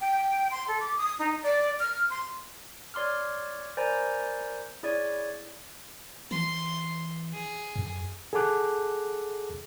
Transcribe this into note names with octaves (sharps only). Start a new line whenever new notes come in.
G5
C6
A4
D6
D#6
D#4
D5
F6
C6
C#5 D5 C6 D6 F6
A#4 C5 D5 G#5 A#5 B5
E4 G#4 C#5 D5
E3 C6
G#4
F#2
G#4 A4 F#5 A5 D6 F#6